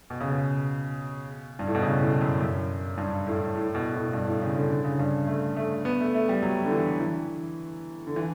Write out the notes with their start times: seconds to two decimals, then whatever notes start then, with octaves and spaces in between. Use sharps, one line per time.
0.10 B2
0.21 C#3
0.31 B2
1.59 G2
1.67 A2
1.75 B2
1.82 C#3
2.01 A2
2.21 F#2
2.40 F#2
2.97 G2
3.27 A2
3.56 A2
3.75 B2
3.94 A2
4.13 G2
4.28 A2
4.42 C#3
4.56 D3
4.71 D3
4.85 C#3
4.99 G2
5.27 A3
5.57 A3
5.85 B3
6.00 A3
6.14 A3
6.29 G3
6.43 F#3
6.66 D3
6.71 E3
7.00 E3
8.07 D3
8.16 E3